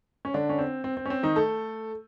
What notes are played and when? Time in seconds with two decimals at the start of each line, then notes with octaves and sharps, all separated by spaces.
0.25 C#4
0.34 D3 D4
0.49 C#4
0.59 C4
0.84 C4
0.97 C4
1.06 C#4
1.10 C4
1.23 D#3 D#4
1.36 A3 A4